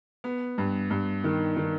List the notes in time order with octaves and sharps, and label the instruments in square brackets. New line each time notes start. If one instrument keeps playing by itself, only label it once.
[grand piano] B3
G2
G2
D#3
D#3